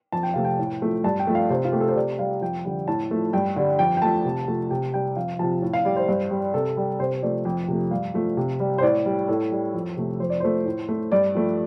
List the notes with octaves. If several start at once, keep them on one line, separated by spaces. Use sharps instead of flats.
F2 A5
G5
C3 A3 F5
G5
A2
F3 A3
G2 A5
G5
F3 A3
F5
C3 C5
F4
A3 G4
A4
C5
C3 D5
G3 F5
F2 G5
D3 G3
A2 A5
F3 A3
G2 G5
D3 G3
F2 G5
G5
F3 A3 A5
C3
F3 A3
C3 G5
G3 G5
F2 F5
C3 F3 A5
A2
F5
G3 D5
C5
G2
G3
C3 A4
G3
C3 C5
C5
F3 A3 D5
F2 G5
C3 F3 A3
G2 F5
F3 A3
C3
G3
C5
A2 D5
G3
A2 A4
G3
F2
C3 A3
F2 C5
D5
F3 A3 C5
A2
A3
G2 D5
F3 A3